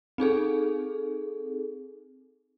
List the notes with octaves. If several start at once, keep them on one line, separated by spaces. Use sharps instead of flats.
C4 D#4 G#4 A4